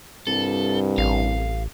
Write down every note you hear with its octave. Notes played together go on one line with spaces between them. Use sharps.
C2 G2 A4
A1 F5